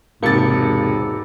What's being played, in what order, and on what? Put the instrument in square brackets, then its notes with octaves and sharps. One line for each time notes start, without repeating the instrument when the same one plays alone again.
[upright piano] E1 C3 A6 [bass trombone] G#2 [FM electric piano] A#3 C#7